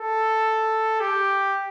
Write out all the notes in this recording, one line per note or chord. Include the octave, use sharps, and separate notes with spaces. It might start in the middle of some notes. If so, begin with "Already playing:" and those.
Already playing: A4
G4